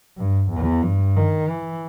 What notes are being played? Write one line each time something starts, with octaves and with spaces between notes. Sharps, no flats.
G2
E2
G2
D#3
E3